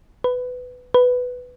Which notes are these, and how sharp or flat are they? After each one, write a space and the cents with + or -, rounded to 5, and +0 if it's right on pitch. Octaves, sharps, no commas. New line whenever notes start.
B4 +15
B4 +5